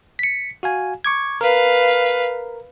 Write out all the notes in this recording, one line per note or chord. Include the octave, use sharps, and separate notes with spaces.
B6 C#7
F#4 F5 G#5
C#6 D6 G#6
A#4 B4 F5